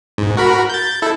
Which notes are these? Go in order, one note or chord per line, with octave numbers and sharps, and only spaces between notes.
G#2
F#4 A#4 B5
G6 A6
E4 A4